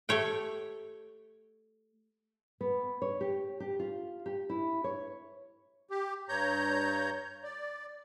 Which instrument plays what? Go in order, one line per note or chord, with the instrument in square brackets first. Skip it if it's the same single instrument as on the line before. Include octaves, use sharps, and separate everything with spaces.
[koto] A3 G4 C#5 G5
[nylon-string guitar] B3
C#5
G4
G4
F4
G4
E4
C#5
[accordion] G4
G2 C#5 A#5 G6
D5